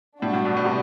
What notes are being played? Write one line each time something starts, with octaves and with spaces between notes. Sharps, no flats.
A2 G3 D4 F#4
A2
B2
B2
C3